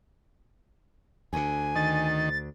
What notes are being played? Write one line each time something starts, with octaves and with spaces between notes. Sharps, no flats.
D2 D3 G#5
D#3 A6